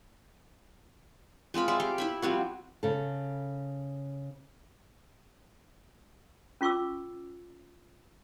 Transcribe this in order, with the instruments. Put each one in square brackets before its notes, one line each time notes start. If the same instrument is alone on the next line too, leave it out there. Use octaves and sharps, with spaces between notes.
[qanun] G#3 C4 F4 B5
G#4 D5 E5
G4 F5 G5
E4 E5 B5
F3 G3 C4 F#4
[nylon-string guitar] C#3 A4
[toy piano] C#4 F4 C#6 D6 E6